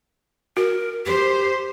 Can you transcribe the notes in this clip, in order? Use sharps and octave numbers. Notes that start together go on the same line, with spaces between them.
F#4 A#4
G4 C5